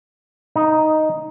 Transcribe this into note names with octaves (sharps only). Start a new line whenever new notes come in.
D#4